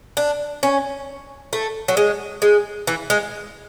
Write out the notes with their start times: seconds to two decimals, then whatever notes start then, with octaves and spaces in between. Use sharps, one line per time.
0.17 D4
0.63 C#4
1.53 A3
1.88 F#3
1.97 G#3
2.42 G#3
2.87 E3
3.10 G#3